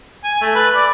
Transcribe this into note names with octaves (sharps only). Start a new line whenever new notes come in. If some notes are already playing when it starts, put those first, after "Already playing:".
G#5
A3
B4
D5